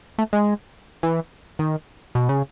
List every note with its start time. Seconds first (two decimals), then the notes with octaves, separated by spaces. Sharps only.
0.18 A3
0.33 G#3
1.03 E3
1.59 D#3
2.15 B2
2.29 C#3